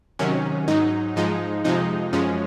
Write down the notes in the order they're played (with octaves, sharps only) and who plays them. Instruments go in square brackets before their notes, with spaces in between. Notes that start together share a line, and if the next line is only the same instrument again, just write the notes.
[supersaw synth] C3 D#3 F#3 C#4
G#2 F#3 D#4
G#2 F3 G#3 D#4
F2 C3 F3 G#3 D#4
F#2 F3 G#3 C#4